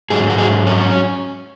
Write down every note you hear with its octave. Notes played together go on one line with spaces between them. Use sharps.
G#2 F#3 G#4
F#4
G#4
C#4